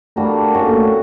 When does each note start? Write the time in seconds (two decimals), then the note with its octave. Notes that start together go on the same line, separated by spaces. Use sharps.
0.16 G3 A3 A#3 D4 F#4
0.54 A3 C#4 F#4 A4
0.66 A#3
0.77 A3